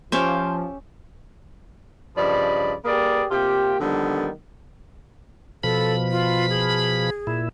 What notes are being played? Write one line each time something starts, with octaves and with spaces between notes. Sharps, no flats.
F3 C#4 G4 C5 E5 F5
G2 C#3 F3 D5 D#5 B5
A#3 G4 G#4 A#4 B4 D5
C3 A#3 F4 G4
D3 D#3 F3 G3 A#3 B3
B2 F3 A4 B5
F4
G#4
A#2 E4